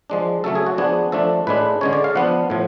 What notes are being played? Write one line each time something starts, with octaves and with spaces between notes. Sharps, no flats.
F3 G#3 D4
C#3 F#3 A3 C#4 A4
G#4
F#4
F3 B3 D4 G#4
F3 A3 D4 A4
A2 G#3 D4 B4
D3 G#3 C#4 C#5
D5
F5
F3 B3 D4 F#5
A2 F3